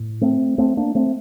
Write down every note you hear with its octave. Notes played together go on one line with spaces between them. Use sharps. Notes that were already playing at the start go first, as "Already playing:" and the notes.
Already playing: A2
A3 C4
A3 C4
A#3 D4
A3 C4